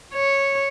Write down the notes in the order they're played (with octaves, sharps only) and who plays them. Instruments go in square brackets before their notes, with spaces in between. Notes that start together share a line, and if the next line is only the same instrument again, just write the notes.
[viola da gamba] C#5